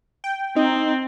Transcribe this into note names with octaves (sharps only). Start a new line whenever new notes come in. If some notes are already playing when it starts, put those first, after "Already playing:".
G5
C4 D#4